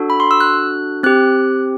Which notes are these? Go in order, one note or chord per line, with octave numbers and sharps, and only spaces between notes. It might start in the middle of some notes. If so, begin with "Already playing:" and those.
Already playing: D4 F#4 A4
B5
C6
E6
F#6
C4 G4 F#6